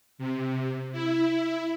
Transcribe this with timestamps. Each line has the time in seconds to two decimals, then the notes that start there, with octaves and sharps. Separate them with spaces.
0.18 C3
0.92 E4